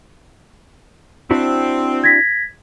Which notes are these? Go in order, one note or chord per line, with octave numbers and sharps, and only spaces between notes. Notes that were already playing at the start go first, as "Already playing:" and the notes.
C4 D4 E4 F#4
G#6 A#6 B6